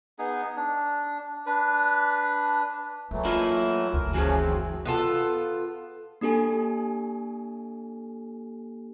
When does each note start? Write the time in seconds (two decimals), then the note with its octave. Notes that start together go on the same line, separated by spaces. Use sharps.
0.19 B3 D#4 G#4
0.56 D4
1.46 D4 B4
3.11 E3 F#3 A3 A#3
3.25 E4 F4 D#5
3.93 F#1 D2 A#4
4.14 E3 F3 C#4 F#4 G#4
4.38 C4
4.85 B3 F4 A4
6.21 A#3 D4 G4 A4 G#5